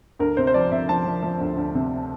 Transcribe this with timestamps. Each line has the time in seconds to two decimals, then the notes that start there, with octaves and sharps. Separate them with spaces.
0.19 D2 A#4
0.37 C3 C5
0.47 C5
0.54 F3 D5
0.71 C3 E5
0.89 F3 A5
1.05 F3
1.23 F3
1.40 D2
1.57 D2
1.75 C3